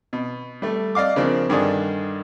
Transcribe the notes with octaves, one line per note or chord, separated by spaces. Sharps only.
B2
G3 A3
D5 D#5 F5 D6
C#3 F3 A#3 C4 D4
G2 D3 D#3 G#4 D5